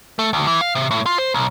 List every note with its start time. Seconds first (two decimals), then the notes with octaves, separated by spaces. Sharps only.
0.19 A3
0.33 D2
0.47 E3
0.61 F5
0.75 C3
0.91 A2
1.06 F4
1.18 C5
1.34 B1